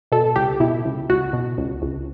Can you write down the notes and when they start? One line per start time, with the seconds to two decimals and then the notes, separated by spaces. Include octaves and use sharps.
0.12 B2 A4
0.36 C#2 G4
0.60 B2 E4
0.85 C#2
1.09 C#2 F#4
1.33 B2
1.58 C#2
1.82 C#2